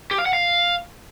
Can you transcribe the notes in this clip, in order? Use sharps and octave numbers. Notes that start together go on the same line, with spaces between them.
G4
F5
F#5
F5